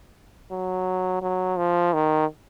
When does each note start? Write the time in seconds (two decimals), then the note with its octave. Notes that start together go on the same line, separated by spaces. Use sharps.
0.51 F#3
1.22 F#3
1.57 F3
1.93 D#3